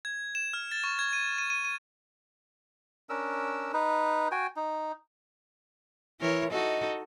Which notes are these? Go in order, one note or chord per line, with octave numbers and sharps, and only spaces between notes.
G#6
E7
F6
A6
C#6
G#6
D#7
D#7
D#7
D#7
C#4 D4 A#4 E6
D#4 B4
F#4 G5 G#5
D#4
E3 E4 A#4 C#5
D#4 F#4 A4 D#5